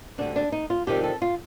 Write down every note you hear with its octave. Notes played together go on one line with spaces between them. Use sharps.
D2 D3 G3 D4
D4
D#4
F4
F2 C3 D#3 G3 G4
A4
F4